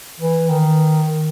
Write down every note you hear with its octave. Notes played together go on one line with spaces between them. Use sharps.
E3
D#3